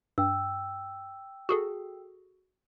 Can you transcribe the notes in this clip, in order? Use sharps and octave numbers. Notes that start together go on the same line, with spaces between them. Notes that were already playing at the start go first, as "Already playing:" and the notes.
G2 G5 E6
F#4 G#4 A4